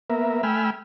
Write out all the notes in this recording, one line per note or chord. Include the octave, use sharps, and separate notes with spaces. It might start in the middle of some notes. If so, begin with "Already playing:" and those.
A#3 B3 A#4 E5
A3 G5 G#5 B5 E6 F6